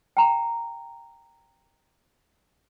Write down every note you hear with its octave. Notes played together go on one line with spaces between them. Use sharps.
G5 A#5